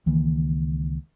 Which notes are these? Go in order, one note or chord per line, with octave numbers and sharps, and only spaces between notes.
C#2 D#3 E3 A#3